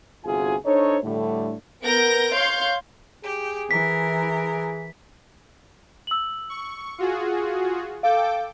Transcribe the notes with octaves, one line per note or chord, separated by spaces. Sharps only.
G1 C3 F4 F#4 G#4 G#5
D4 D#4 A4 C5 C#5
A2 D3 G3 A3
B3 A#4 G6 A#6 D7
C#5 F5 C6 G6
G4 G#4
E3 A#4 B6
E6 F#7
C#6
F4 F#4 G#4
A4 F5 G5 D6